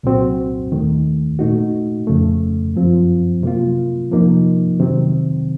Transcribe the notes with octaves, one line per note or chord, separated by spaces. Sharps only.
C2 A#2 F#3 C4 F#4
D#2 D#3 A3
A#2 A3 D#4 F#4
F2 C#3 A3
F#2 F3 C4 F4
C3 F#3 A#3 F4
C3 F3 A#3 D#4
C3 D#3 F#3 C4